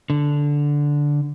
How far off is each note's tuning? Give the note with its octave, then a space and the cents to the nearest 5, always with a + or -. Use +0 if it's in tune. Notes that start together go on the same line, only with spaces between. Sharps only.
D3 -5